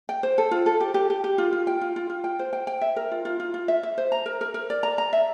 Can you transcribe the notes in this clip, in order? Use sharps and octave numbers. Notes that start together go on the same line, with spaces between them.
G5
C5
A4
F4
A4
G4
G4
G4
G4
F4
F4
G5
F4
F4
F4
G5
C5
G5
G5
E5
A#4
F4
F4
F4
F4
E5
E5
C5
A#5
A#4
A#4
A#4
D5
A#5
A#5
E5